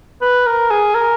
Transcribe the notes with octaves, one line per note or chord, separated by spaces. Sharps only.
B4
A#4
G#4
A#4